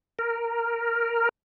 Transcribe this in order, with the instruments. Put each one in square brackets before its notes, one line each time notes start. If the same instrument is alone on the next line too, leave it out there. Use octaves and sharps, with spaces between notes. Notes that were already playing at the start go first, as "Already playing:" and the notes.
[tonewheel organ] A#4